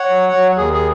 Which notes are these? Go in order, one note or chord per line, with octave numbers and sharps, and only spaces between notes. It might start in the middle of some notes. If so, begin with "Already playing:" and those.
Already playing: C#5 F#5
F#3
F#3
D#2 G#4
G#4